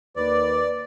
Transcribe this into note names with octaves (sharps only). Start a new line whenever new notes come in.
D#2 B4 D5